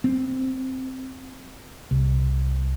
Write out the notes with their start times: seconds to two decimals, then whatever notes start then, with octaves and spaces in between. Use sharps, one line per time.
0.04 C4
1.91 C2